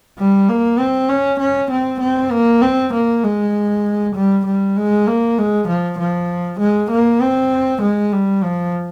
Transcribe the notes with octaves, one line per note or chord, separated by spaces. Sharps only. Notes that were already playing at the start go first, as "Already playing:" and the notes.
G3
A#3
C4
C#4
C#4
C4
C4
A#3
C4
A#3
G#3
G3
G3
G#3
A#3
G#3
F3
F3
G#3
A#3
C4
G#3
G3
F3